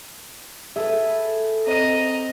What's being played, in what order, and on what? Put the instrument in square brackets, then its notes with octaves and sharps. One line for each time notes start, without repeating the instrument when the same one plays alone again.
[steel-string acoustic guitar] G#4 A4 B4 [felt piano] E5
[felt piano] C4 D#7 [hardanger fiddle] D#5 A#5